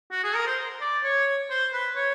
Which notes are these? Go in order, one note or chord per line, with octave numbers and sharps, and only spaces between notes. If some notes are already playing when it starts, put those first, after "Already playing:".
F#4
G#4
A#4
C5
D5
C#5
C5
B4
C#5